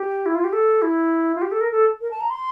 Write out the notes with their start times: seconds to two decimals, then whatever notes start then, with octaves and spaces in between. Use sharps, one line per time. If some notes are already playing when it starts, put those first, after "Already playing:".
Already playing: G4
0.26 E4
0.35 F4
0.44 G4
0.53 A4
0.82 E4
1.35 F4
1.42 G4
1.52 A4
1.61 A#4
1.72 A4
2.01 A#4
2.11 A5
2.21 A#5
2.30 C6